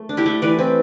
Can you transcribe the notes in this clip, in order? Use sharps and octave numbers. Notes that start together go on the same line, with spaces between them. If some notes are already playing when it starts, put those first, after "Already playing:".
Already playing: A3
D4
E4 G4
A3
E3 B4 D5
C4